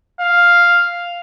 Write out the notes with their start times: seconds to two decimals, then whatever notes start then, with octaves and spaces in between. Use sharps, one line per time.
0.20 F5